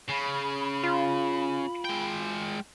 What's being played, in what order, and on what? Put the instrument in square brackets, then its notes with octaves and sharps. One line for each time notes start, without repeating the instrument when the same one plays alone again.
[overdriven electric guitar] C#3 [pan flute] B5
[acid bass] F4
[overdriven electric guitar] G#3 G5